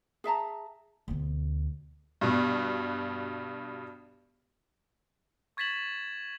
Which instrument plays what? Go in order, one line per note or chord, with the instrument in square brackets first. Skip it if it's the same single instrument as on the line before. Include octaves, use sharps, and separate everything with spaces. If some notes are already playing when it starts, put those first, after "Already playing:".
[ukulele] G#4 E5 A5 A#5
[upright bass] D2 B2
[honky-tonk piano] G2 B2
[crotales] C#6 G#6 A6 B6 E7 F#7